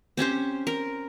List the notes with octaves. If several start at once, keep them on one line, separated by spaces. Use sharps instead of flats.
C4 C#4 G4 C5
A#4